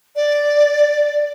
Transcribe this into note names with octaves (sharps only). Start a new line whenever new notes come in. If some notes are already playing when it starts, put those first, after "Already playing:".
D5